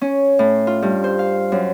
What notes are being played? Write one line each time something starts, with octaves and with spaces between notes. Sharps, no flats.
C#4
A2
F4
G2
C5
F5
F#2